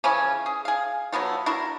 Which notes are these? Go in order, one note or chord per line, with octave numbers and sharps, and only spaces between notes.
C#3 E3 F3 C#4
G#4
G#4 F5
F#3 A3 B3 F4
D4 E4 F#4 A#4